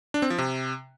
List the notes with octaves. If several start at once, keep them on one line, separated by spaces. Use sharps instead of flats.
D4
C4
F3
C3